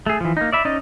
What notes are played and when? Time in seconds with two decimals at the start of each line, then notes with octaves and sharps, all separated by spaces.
0.06 A3 G#4
0.21 E3 F3
0.37 A#3 D#4
0.53 D5 E5 B5
0.65 C#4 D#4 D5 D#5